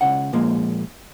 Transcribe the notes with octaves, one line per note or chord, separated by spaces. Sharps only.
C#2 C#3 F#5
A#2 F3 G#3 A#3